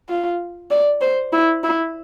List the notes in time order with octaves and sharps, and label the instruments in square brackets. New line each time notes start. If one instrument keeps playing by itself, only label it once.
[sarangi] F4
D5
C5
E4
E4